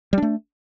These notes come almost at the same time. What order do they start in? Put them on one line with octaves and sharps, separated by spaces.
G3 D4 A3